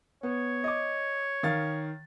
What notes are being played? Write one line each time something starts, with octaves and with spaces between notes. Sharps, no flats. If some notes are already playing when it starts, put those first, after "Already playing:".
B3 C#5
D#5 D6
D#3 F5 A6